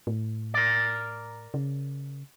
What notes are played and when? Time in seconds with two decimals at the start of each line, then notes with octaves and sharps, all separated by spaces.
0.07 A2
0.54 A#4 D5
1.54 C#3